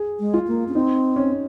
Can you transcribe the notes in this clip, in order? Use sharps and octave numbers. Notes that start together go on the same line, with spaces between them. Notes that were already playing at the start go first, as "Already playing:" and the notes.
Already playing: G#4
G#3
F4
A#3
C#4
C4 D#4
C#4